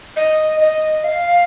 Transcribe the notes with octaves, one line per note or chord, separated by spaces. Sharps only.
D#5
D#5
F5